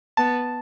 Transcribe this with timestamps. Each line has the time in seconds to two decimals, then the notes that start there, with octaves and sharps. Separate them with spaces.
0.17 B3 A5